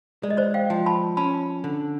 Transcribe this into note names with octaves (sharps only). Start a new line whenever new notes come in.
G#3 D5
D#5
C5 D5
F5 G5
F3
A5 B5
C#4 A5 B5
D3